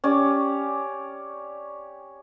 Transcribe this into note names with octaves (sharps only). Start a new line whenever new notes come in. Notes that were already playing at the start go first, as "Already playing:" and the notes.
C#4 G4 D5